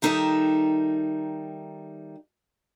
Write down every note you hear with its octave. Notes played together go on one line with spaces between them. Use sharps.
D#3 G3 D#4 A4 E5